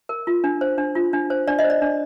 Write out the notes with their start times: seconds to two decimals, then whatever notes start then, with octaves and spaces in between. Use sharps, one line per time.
0.09 A#4
0.27 F4
0.44 D4
0.61 C5
0.78 D4
0.95 F4
1.13 D4
1.30 C5
1.48 D4 D5
1.59 D#5
1.64 C5
1.70 D5
1.82 D4